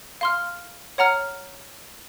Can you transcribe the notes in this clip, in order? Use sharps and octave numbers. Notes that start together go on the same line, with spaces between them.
F5 C6 F6
C#5 F#5 A#5 F6